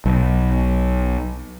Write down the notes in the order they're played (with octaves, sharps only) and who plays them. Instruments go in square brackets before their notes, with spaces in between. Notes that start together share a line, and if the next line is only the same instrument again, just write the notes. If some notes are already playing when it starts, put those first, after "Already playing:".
[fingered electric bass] B1